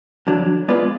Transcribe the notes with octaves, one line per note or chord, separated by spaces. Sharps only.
F2 D3 F#3 D4
G#3 B3 F4 B4 D5